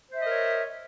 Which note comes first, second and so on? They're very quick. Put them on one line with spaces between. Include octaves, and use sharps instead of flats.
C5 E5 D#5 A#4 C#5